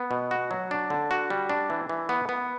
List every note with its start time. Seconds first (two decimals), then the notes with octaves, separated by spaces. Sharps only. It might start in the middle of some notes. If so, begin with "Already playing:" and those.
Already playing: B3
0.11 B2
0.31 F#4
0.51 F#3
0.71 D4
0.90 D3
1.11 F#4
1.30 G3
1.49 D4
1.70 E3
1.89 E3
2.09 B3
2.29 B3